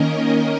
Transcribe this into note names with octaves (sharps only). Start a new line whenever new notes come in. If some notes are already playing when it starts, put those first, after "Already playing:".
Already playing: D#3 A#3 C#4 A#4 D#5